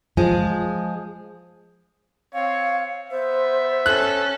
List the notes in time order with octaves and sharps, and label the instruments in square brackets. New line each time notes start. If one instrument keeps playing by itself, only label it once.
[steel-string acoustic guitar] F3 G#3 G#4
[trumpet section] C4 C#5 [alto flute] F5
[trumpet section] B3 E5 [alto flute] C5
[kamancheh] C#4 A4 [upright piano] F#6